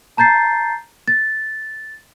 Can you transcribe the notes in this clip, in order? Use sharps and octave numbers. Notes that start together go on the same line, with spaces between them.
A5 A#5 G6 A6 C7
A6